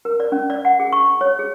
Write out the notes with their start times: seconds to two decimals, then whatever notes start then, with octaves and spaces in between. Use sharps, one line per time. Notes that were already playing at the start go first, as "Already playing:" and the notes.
0.05 A#4
0.20 D5
0.32 C#4
0.50 D5
0.65 F#5
0.80 G#4
0.93 C#6
1.06 C#6
1.21 C#5
1.39 G#4